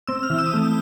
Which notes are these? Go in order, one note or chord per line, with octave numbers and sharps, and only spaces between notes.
C4 E6
F6
E3
E6
D#6
A3 E6